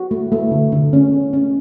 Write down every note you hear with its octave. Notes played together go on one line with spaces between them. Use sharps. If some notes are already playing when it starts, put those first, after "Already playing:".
Already playing: F#4
A3
A3
D3
D3
C#4
A3
C#4